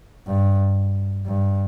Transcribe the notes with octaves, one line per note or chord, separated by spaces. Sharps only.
G2
G2